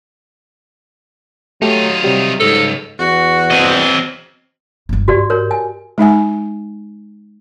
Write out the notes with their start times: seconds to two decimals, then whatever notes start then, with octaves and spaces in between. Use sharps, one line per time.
1.62 F#3 A3 D#4 F4 G4
2.04 C3 F#3 G3
2.40 C#2 G#2 A4
2.99 E2 F#4
3.51 C4 D#5
4.89 G1 G#3
5.08 G#2 F#4 G4 D5
5.30 A#4 C#5
5.51 G#5
5.98 G#3 D#4 E5 G#5